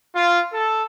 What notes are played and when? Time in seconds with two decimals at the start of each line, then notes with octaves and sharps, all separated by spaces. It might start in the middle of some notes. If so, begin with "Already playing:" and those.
0.14 F4
0.52 A4